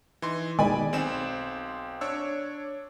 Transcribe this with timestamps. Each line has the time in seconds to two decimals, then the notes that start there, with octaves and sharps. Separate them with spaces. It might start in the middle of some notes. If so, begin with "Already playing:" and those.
0.22 E3 D#4 C6
0.59 B2 D#3 G#3 D5 G#5 B5
0.93 B1 C4 E7
2.01 D4 C#5 E6